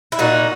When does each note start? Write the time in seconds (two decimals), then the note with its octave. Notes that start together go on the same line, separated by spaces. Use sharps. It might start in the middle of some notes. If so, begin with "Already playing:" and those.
0.12 E4
0.19 A#2 D#4 F#4